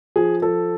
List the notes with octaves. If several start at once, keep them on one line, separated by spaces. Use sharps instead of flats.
F3 G#4
F3 A4